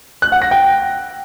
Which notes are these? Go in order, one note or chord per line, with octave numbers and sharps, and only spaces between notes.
F#6
F#5
A#6
G5